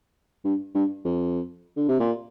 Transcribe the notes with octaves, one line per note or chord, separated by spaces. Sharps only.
G2
G2
F2
D3
C3
A#2